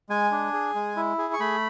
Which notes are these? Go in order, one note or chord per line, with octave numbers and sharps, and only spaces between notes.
G#3 G#5
D4
G#4
G#3
E4
G#4
C#6
A3 B5